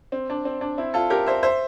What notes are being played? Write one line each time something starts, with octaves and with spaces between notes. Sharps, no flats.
C4
D4
C4
D4
C4 E4
F4 A4
G4 A#4
C5 E5
C5 E5